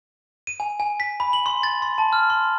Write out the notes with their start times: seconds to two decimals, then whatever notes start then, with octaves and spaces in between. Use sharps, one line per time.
0.47 D#7
0.60 G#5
0.80 G#5
1.00 B6
1.20 B5
1.33 F#7
1.46 C6
1.63 A6
1.82 C6
1.98 A5
2.13 F6
2.30 C6